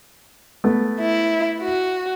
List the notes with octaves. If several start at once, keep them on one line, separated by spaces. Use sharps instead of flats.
A3 B3
E4
F#4